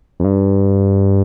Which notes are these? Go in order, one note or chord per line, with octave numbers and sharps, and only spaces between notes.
F2
G2